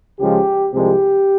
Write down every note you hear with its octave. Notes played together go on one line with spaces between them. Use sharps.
C#2 C#3 F3 G#3 G4
C2 C3 F3 G#3 G4